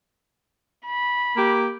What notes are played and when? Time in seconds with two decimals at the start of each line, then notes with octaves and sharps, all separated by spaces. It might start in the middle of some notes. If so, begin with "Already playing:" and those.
0.86 B5
1.37 A#3 G4